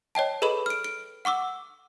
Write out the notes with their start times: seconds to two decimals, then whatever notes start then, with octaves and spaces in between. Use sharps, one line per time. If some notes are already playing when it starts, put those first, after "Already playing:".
0.15 C#5 D#5 G5 A5
0.42 G#4 A4 B4 D#5 B5 F#7
0.66 F6 D7
0.84 D7
1.25 F#5 C#6 D6 E6